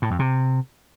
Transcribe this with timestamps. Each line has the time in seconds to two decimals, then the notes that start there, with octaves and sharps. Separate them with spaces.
0.02 A2
0.11 F2
0.19 C3